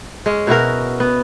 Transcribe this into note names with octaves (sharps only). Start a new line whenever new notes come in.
G#3 C#4
B2 E4 F#4 A#4
B3